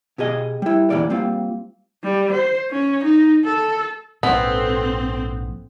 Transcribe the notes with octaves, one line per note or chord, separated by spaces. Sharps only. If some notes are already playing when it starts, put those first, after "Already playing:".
B2 G4 G#4 D#5
G3 E4
E2 A#2 E3 G3 D5
G3 A#3 C4 F4
G3
C5
C#4
D#4
A4
A#1 G#2 B3 C4 A4